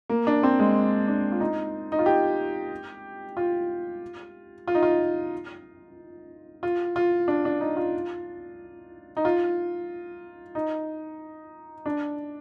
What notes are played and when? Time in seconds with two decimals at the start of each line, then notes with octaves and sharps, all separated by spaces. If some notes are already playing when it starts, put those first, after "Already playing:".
0.09 A#3
0.27 D4
0.43 C4
0.59 G#3
1.08 D4
1.32 F4
1.40 D#4
1.92 D#4
1.99 F4
2.06 G4
3.37 F4
4.68 F4
4.75 D#4
4.83 F4
6.63 F4
6.96 F4
7.28 D4
7.45 D4
7.60 D#4
7.77 F4
9.17 D#4
9.25 F4
10.55 D#4
11.86 D4